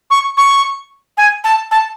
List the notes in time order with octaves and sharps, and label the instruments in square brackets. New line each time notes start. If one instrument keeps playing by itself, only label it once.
[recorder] C#6
C#6
G#5
A5
A5